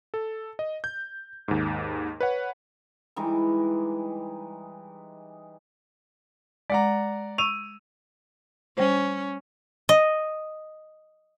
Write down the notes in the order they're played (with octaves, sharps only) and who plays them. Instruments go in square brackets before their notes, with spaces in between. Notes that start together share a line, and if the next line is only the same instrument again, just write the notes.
[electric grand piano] A4
D#5
G6
D#2 G#2
B4 C#5 F#5
[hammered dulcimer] E3 G3 G#3 D#4
[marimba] G#3 [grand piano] D5 F#5 A#5
[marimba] C#6 [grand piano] E6 D#7 F7
[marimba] G3 C5 [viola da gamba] C#4
[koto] D#5